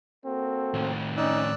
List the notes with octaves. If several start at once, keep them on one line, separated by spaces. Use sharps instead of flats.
A#3 C4 F#4 A4
A2 D#3
C#4 D#4 D5 E6 F#6